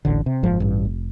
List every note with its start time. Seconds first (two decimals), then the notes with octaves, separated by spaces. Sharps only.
0.05 D#1 A1 D3
0.26 C3
0.43 F#1 G#2 F3
0.60 A1 G2
0.85 F1